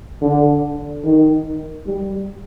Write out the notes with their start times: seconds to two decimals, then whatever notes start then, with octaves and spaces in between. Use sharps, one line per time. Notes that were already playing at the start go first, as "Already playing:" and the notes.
0.22 D3
1.04 D#3
1.86 G3